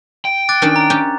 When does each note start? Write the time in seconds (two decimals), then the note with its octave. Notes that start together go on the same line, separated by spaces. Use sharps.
0.25 G5
0.49 D6 F#6 A6
0.62 D#3 C#4 D4
0.76 A#5
0.90 C#4 G4